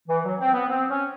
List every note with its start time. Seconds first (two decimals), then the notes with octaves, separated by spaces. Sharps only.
0.08 E3
0.24 F#3
0.39 C4
0.53 B3
0.69 C4
0.89 C#4